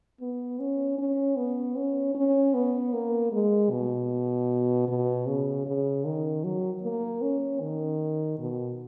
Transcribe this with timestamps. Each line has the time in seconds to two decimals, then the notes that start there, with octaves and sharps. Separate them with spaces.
0.21 B3
0.60 C#4
0.99 C#4
1.37 B3
1.76 C#4
2.15 C#4
2.54 B3
2.93 A#3
3.32 G#3
3.71 B2
4.88 B2
5.27 C#3
5.66 C#3
6.05 D#3
6.44 F#3
6.83 A#3
7.22 C#4
7.61 D#3
8.39 B2